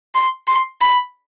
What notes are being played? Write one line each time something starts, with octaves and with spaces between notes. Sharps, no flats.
C6
C6
B5